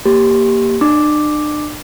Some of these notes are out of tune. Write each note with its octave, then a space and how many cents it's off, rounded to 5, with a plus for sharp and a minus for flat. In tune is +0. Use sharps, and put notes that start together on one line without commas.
A#3 +0 G4 +0 C6 +0
D4 +40 D6 +0